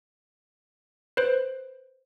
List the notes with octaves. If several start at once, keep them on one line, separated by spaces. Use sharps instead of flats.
B4 C5